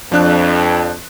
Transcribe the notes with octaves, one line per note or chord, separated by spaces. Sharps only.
F2 F3 D4 F#6